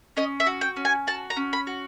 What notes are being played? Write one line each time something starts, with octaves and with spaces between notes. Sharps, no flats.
C#4 D#5
E5
F#4
G5
C#4
G#5
F#4 A5
A#5
C#4
B5
F#4